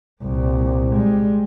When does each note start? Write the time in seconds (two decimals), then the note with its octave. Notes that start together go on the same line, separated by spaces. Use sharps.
0.22 C2 A#2
0.93 G3 G#3